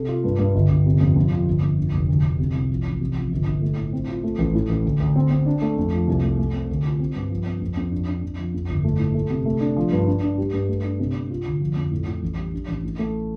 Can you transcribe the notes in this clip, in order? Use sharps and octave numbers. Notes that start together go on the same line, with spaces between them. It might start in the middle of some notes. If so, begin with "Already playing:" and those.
Already playing: C3 A4
F4
G2
G2
G1
G1
C3
F2
F2
F3
G1
F2
D3
F1
D2
D2
C3
C2
F3
A1
C3
F3
G1
G1
A3
A2
C4
F4
A3
A1
A2
A1
D2
D2
C4
C4
D4
A3
F2
F3
C2
A3
A3
C4
D2
F4
C4
G2
F3
C4
F2
F2
D4
D4
F2
F3
F2
G1
A3
A2
A3
C3
A3
D4
F3
G2
D4
D4
G3
G2
A3
D4
C3
C3
F4
D2
F3
F2
A2
A2
A1
G3
D4
A1
A2
A3